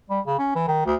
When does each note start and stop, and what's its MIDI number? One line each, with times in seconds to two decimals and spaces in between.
0.10 0.20 55
0.26 0.37 49
0.39 0.55 61
0.55 0.65 52
0.68 0.85 51
0.86 0.95 38